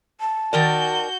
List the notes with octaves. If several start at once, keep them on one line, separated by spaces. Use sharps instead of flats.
A5
D#3 F#4 A#4 D5 G6